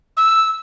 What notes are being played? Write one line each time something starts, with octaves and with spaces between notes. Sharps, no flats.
E6